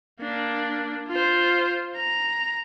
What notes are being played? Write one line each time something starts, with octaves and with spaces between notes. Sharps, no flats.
A#3 D4
F4 C5
A#5